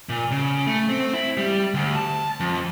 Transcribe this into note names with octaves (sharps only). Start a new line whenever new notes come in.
A#2
C#3
A3
C4
E4
G3
D2
A5
F2